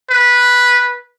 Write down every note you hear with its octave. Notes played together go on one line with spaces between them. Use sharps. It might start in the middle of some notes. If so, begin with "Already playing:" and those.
B4